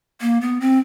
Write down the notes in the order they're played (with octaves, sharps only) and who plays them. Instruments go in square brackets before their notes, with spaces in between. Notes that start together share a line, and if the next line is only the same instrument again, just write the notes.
[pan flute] A#3
B3
C4